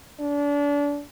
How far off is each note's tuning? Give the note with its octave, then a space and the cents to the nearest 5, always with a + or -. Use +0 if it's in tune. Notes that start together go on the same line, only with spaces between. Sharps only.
D4 -30